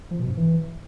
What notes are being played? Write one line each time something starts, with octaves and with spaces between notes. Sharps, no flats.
F3
B2
G2
E3